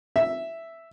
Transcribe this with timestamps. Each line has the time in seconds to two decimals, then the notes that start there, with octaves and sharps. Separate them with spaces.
0.16 E5